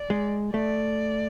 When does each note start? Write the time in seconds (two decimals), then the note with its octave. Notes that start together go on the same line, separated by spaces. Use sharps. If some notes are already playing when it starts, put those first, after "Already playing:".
Already playing: D5
0.10 G#3
0.54 A3 D5